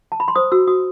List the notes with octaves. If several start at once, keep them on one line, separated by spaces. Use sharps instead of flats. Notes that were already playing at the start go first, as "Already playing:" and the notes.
A5
B5
C6
C5 D#6
F#4 E6
F#4 D#6